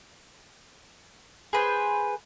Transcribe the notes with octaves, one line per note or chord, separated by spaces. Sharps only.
G#4 B4 C5